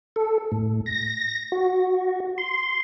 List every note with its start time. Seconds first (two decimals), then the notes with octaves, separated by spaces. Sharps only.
0.16 A4
0.52 A2
0.86 A#6
1.52 F#4
2.38 C6